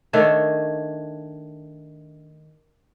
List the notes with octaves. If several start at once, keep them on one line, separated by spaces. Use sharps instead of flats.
D#3 A3 D4 C#5